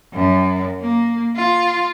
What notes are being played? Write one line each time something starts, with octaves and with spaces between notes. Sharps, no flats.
F#2
A#3
F4